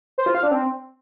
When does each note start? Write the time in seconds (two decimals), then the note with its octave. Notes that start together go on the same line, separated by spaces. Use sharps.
0.18 C5
0.26 F4
0.35 F5
0.43 D4
0.51 C4